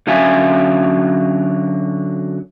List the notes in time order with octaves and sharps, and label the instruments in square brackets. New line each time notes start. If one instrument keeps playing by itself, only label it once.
[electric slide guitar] D3 F#3 C#4 E5 F5 G#5